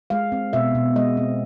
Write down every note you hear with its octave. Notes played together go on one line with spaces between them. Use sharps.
G#3 F5
C4
B2 E5
B2
G#3 D#5
C4